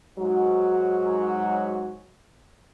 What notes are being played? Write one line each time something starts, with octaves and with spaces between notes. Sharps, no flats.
G#2 F#3 F#4